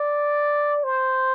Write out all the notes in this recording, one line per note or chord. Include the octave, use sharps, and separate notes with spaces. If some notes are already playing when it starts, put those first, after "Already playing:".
Already playing: D5
C5